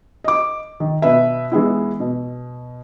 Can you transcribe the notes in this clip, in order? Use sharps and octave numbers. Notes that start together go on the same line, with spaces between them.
D#5 D6
D#3
B2 B4 E5
E3 G#3 B3 E4
B2